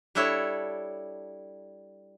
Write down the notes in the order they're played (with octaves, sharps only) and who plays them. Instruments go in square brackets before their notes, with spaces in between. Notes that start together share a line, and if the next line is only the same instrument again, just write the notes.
[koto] G3 D4 E4 A4 C#5 A5